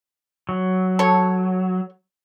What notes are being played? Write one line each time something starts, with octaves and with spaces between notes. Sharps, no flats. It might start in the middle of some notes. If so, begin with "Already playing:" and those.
F#3
A4 C#5